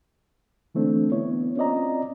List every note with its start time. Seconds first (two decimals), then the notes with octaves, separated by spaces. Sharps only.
0.75 D3 E3 A3 C4 D4
1.11 B3 E4 C#5
1.56 C4 C#4 F4 D5 D#5 A#5